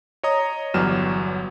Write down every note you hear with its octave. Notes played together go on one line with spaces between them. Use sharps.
C#5 D#5 A#5 D#6
G1 E2 F#3 G3 F6 E7